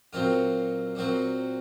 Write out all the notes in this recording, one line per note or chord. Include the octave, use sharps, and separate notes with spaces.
A#2 F#3 C4 F4
A#2 F#3 C4